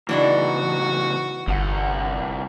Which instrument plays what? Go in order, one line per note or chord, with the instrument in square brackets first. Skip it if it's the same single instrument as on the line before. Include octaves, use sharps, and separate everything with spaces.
[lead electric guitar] A2 C#3 [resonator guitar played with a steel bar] E3 D4 D#4 [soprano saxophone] F#4
[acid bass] G1 [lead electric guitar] C2 F#5